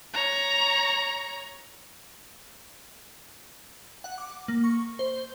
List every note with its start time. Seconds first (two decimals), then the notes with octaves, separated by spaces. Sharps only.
0.14 C#5 A#5
4.04 F#5
4.18 D6
4.48 A#3
4.64 C#6
4.99 C5